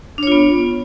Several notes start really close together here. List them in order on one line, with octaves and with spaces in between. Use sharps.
D4 C#5 F4 B3